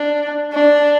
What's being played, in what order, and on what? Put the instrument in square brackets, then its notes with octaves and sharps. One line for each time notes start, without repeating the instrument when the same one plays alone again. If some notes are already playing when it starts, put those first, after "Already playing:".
Already playing: [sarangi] D4
D4